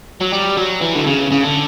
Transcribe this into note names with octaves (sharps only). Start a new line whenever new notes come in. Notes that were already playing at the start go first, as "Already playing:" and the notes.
F#3
G3
F#3
E3
D3
C#3
C#3
D3